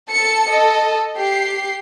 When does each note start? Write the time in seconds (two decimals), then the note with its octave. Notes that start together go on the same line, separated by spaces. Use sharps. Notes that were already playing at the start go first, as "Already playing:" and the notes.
0.11 A4 A5 C#7
0.49 A4 D#5
1.17 G4 C7